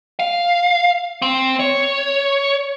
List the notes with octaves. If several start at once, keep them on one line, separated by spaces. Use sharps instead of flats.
F5
C4
C#5